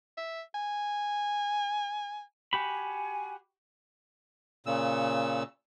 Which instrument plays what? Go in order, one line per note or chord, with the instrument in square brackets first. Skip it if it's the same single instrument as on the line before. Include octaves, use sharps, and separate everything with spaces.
[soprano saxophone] E5
G#5
[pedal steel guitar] F#4 G4 B5 [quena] G#5
[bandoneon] A#2 C#3 E6